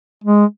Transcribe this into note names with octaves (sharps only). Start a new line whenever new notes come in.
G#3